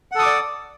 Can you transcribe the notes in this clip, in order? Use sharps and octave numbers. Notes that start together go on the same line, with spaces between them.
A4 D5 F#5 D6 D#6